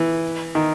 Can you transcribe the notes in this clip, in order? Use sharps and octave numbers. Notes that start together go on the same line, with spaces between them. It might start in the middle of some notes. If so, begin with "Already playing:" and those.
Already playing: E3
D#3